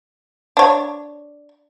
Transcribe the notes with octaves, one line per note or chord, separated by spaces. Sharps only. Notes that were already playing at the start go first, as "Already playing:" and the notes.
D4 C#5